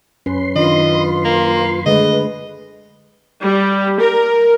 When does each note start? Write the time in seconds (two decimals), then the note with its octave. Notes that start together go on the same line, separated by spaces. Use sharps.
0.26 F#2 C#4 B4 C6
0.56 D#3 D4 F4 D#5
1.25 A#3
1.86 D3 G#3 A3 B4 D#5
3.41 G3
3.99 A#4